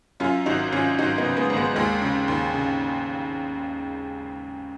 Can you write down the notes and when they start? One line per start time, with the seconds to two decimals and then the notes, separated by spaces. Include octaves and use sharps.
0.20 F#2 C#4 F4
0.46 G#1 D#4 F#4
0.72 G#1 C#4 F4
0.98 G#1 D#4 F#4
1.18 B3 D#4
1.25 C#3
1.37 G#3 B3
1.50 G#1
1.57 G#3 B3
1.76 D#2 G#3
2.02 C#3
2.28 D#2
2.54 C#3